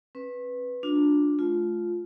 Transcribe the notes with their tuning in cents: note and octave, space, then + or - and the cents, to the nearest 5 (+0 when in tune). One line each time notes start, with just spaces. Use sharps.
C#4 -45 B4 +0
D4 +0 F4 +45
A3 -35 F4 +0